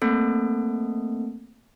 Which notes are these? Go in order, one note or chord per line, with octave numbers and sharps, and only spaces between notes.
A3 A#3 C4 A4